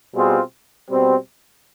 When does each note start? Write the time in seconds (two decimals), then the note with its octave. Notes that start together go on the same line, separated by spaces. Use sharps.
0.14 B2 G3 C4 F4 G#4
0.90 B2 G3 C4